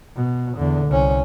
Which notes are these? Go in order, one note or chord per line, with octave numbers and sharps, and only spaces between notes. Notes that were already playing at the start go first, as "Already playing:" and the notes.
B2
E2 D3
C2 C#4